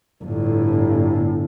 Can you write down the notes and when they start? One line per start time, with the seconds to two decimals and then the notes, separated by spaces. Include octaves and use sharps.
0.23 G1 A2